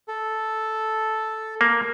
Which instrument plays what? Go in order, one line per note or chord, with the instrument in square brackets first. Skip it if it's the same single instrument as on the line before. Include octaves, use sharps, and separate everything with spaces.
[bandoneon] A4
[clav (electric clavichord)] A#3